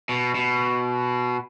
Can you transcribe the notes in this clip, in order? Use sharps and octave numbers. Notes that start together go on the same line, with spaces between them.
B2
B2